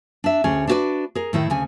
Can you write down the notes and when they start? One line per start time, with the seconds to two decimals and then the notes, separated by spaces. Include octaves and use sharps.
0.24 D4 E5
0.44 D2 C#4 G#4
0.67 D4 E4 F#4 G#4 B4 D5
1.15 G#4 A#4
1.33 A2 D#3 E4 A#4
1.50 D2 C#3 G#5